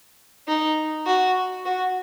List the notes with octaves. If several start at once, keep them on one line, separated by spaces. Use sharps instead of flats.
D#4
F#4
F#4